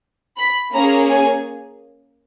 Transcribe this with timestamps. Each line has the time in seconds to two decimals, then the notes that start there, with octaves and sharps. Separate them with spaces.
0.38 B5
0.74 A#3 C#4 G#4 A#5
1.10 G#5